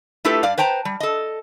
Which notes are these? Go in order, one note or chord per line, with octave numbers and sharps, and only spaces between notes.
A3 E4 F4 G4 A4 B4
G2 D5 F5
B4 C5 G5 A5 A#5
G3
A4 D#5